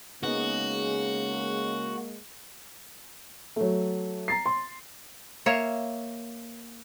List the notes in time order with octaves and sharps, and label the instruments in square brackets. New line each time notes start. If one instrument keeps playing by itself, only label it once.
[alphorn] C#3 [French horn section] G#3 A#3 [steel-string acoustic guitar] B3 D#4 G#4 [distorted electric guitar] F#4
[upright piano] F#3 A3
A#5 A6 C7
C6
[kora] A#3 C#5 E5 F5